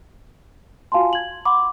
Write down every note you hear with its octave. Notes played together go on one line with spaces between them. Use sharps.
F4 F#4 F5 G#5 A5 C6
G#6 F#7
F#5 B5 C6 D6